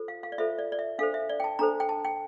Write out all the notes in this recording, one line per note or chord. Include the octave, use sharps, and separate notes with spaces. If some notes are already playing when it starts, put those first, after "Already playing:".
Already playing: F4 A4 C5
F5
F5
D5
F4 A4 C5 E5
D5
D5
E5
D4 A4 C5 F5
E5
D5
G5
A5
D4 A4 C5 A#5
G5
A5
G5